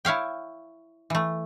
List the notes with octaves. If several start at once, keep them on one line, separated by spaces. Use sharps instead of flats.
E4 C#5 F5 G5
E3 A3